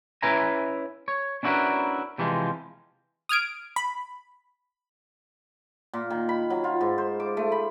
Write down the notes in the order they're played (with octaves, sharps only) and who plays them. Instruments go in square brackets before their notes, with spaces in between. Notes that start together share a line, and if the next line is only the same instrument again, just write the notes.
[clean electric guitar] C#4 E4 B4 E5 G#5 A#5
C#5
C#4 D4 E4 F#4 A#4 B4
C3 E3 F3 G#3
[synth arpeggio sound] D#6 F6 G#6 D7
B5
[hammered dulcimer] A#2
D#3
B5
F#3
F4
G#2
C5
D6
A3
B5